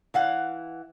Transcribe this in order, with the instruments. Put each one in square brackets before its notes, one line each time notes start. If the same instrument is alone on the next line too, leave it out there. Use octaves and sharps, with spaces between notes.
[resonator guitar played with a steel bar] E3 F5 F#5